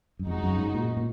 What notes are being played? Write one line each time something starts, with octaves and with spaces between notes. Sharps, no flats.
F#2
F2 C#3 G#3 D#4 F#4
F#2
G#2
A#2
A#2